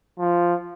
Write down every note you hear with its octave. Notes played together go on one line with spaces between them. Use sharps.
F3